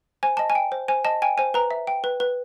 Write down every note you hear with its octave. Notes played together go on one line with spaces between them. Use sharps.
C5 G#5
D#5 A5
G#5
G5
C5
C5 G#5
D#5 A5
G5 G#5
C5 G#5
B4 A#5
E5
G5
B4
B4